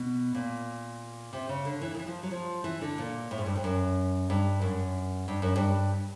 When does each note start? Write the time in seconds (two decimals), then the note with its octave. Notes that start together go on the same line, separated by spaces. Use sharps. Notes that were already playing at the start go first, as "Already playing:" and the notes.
Already playing: B2
0.35 A#2
1.33 C3
1.49 C#3
1.65 D3
1.82 E3
1.95 D#3
1.99 E3
2.07 F3
2.23 F#3
2.31 F3
2.64 E3
2.81 D3
2.98 A#2
3.31 A2
3.38 G#2
3.46 G2
3.56 F2
3.64 F#2
4.30 G2
4.62 F#2
5.28 G2
5.42 F#2
5.56 G2